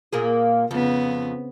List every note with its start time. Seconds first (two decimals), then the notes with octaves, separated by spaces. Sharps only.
0.13 A#2 A#3 G#4
0.71 F2 C#3 B3